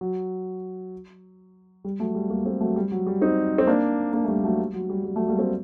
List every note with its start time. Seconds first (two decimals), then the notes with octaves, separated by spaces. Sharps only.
0.01 F#3
1.84 G3
1.99 F#3 A3
2.15 G3
2.30 G3 A#3
2.45 A3 C4
2.60 F#3 A3
2.76 G3
2.92 F#3
3.06 G3
3.22 C4 D#4
3.58 C4
3.67 A#3 D4
4.13 A#3 D4
4.24 A3
4.28 G3 A#3
4.44 F#3 A3
4.59 G3
4.74 F#3
4.90 G3
5.05 G3
5.16 F#3 A3
5.28 G3 A#3
5.39 A3 C4